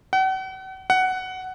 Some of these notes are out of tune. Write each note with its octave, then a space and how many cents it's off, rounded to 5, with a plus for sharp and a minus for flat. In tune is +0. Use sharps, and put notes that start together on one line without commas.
F#5 +40
F#5 +10